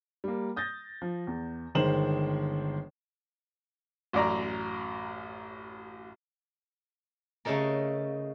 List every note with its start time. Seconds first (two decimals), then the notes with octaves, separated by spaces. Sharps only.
0.24 G3 A#3
0.56 D#6 G6 A6 A#6
1.02 F3
1.27 E2
1.75 G1 D#3 G#3 C5 E7 F#7
4.13 A1 F#2 D5 A#5
7.45 C#3 A3 D#4 A4 A#4